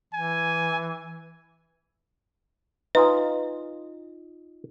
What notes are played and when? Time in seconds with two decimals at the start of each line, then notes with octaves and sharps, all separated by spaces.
0.14 E3 G#5
2.95 D#4 F4 B4 G#5